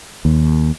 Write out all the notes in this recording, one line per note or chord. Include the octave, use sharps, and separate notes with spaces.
D#2